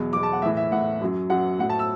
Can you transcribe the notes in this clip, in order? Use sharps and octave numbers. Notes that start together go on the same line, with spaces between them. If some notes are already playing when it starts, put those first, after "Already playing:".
Already playing: E2 B2 F#3
E2 B2 F#3 D6
A5
F#5
A2 E3 E5
E5
A2 E3 F#5
F#2 F#3
F#2 F#3 F#5
A2 F#3 F#5
A5
E6